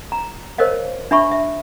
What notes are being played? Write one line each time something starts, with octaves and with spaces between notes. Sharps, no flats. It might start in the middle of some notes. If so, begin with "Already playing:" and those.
A#5
A#4 C5 C#5 D#5 F5
D4 E5 B5 C#6
E5